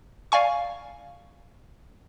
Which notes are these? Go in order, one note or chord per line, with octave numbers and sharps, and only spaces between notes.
D5 F5 G#5 C#6